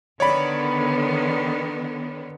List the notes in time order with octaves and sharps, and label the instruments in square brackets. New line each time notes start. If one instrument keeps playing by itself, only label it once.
[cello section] D3 D#3 B3 [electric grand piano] C#5 D5 B5